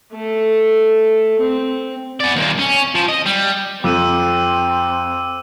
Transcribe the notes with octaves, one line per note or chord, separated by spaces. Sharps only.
A3 A4
C4
B3 D5
D#2 A#2
C#4
F3
D#5
G3
F2 C4 D6 E6 D#7